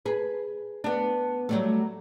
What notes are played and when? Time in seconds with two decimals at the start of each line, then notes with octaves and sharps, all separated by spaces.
0.06 G#4 B4
0.84 B3 D4
1.49 F#3 G3 A3